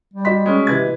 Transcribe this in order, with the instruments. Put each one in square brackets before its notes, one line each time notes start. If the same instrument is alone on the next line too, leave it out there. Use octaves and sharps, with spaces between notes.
[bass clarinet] G3
[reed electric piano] F#4 D#5 C6 [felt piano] B6
[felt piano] G#3 C#4
[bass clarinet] C3 [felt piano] E3 B4 G#6